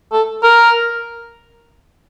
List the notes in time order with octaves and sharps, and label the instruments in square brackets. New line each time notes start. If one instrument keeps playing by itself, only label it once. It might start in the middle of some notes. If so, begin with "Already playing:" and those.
[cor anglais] A4
A#4